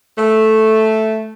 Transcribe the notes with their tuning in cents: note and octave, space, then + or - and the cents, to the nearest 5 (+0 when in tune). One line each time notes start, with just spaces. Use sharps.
A3 -5